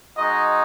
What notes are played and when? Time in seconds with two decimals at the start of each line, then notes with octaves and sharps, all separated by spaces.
0.17 G#3 D#4 F#4 D#5